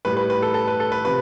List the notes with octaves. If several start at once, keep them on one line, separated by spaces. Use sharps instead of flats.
A2 G3 B4
B4
B4
A4
A4
B4
A4
B4
C3 F3 B4